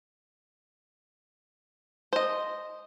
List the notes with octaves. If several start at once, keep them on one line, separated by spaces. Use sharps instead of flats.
C5 D#5